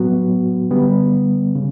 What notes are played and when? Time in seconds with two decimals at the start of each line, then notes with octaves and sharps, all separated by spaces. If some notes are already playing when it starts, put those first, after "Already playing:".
Already playing: A2 F#3 B3 F#4
0.71 D3 G3 B3
1.56 C#3